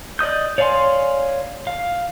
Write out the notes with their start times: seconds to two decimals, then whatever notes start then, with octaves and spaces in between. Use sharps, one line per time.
0.19 D5 D#5 D#6 G6
0.58 C#5 D5 F5 G#5 C6
1.67 F5